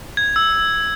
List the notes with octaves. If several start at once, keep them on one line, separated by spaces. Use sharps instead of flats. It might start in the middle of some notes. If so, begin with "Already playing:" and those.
G#6
E6